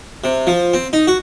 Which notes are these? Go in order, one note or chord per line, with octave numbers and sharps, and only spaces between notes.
C3
F3
C4
D#4
F#4